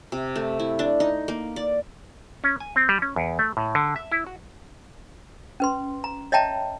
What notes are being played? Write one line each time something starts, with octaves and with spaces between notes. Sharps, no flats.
C3
A3
E4
D4
D#4
A#3
D5
C#4
G#5
C4
G3
C#4
E2
A3
A2
D3
E5
E4
F#4
C#4 B4 C6
A#5
C#5 D#5 E5 G5 A5 A#5